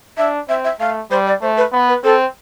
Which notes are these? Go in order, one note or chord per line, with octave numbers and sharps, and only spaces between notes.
D4 E5
C4 E5
E5
A3 F5
G3 C5
D5
A3 C5
B4
B3
B4
C4 A4